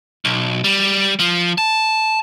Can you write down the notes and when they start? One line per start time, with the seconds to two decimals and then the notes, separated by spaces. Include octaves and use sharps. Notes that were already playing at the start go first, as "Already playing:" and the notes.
0.25 B1
0.64 G3
1.19 F3
1.58 A5